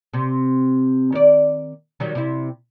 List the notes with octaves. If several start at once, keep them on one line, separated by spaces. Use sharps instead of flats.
C3
D#3 D5
D#3 F#3 G3
C3 E4